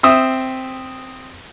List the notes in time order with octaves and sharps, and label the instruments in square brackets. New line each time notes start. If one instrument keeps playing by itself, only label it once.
[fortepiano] C4 E5 D#6